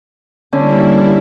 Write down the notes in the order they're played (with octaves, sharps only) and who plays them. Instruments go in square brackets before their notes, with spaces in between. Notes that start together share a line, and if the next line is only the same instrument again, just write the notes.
[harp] D3 C#4 [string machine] G3 A#3 E4